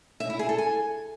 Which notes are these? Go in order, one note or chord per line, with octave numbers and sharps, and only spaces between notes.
E5
E4
G#4
A4
G#5